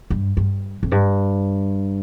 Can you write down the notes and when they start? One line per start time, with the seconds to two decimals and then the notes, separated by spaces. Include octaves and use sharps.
0.10 G2
0.37 G2
0.83 F2
0.92 G2